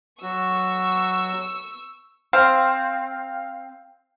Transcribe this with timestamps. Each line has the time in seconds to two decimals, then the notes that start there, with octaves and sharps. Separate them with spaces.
0.23 F#3 F#4 C#6 E6
2.33 C4 F5